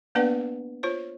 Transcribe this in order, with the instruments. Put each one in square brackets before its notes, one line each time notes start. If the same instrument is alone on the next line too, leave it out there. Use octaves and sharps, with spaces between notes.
[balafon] A#3 B3 D4 B4 D5 F#5
F4 C5 C#5